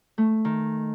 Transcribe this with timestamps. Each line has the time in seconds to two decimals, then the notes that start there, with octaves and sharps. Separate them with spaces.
0.18 A3
0.45 D#3